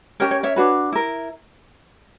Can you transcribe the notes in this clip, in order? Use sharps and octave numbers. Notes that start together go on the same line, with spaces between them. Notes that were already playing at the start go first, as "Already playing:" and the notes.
C#4 G4 A#4 C#5
C#5
C#5 E5
D4 F#4 B4
E4 A#4